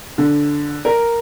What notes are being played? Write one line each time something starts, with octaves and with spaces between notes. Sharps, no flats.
D3
A#4